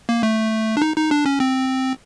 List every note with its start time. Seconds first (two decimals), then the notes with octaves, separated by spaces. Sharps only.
0.09 A#3
0.23 A3
0.77 D4
0.82 D#4
0.96 D#4
1.11 D4
1.26 C#4
1.40 C4